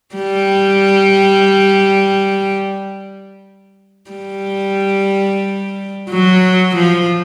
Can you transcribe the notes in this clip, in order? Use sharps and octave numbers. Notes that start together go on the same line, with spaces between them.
G3
G3
F#3
F3